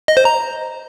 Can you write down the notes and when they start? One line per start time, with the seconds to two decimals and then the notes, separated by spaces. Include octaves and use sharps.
0.08 D#5
0.17 C5
0.25 A#5